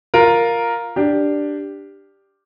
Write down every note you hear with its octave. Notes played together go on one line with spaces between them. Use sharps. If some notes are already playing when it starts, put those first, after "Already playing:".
F4 A#4
D4 G4